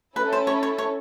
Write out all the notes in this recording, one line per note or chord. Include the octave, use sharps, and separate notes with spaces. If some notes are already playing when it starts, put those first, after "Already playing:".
C#4 E4 A4 B4
C5
C#5
C#5
C#5